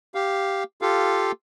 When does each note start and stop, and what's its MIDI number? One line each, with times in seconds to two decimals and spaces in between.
0.15 0.64 67
0.15 0.64 77
0.82 1.32 65
0.82 1.32 67
0.82 1.32 69
0.82 1.32 77